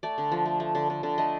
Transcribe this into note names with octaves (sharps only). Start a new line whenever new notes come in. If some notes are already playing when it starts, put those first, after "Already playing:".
A3 D5
D3
F3
A3
A3
D3
D3
D3
A3 D#5